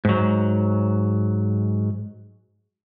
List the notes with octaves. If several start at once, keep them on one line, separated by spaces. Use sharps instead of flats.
G#2 F#3